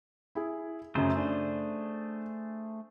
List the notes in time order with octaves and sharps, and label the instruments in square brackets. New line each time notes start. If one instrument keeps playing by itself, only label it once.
[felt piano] E4 G#4
[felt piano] F#2 C#3 [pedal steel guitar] A3 G#4 C5
[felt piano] D4